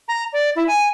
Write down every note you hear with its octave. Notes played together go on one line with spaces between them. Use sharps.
A#5
D5
E4
G#5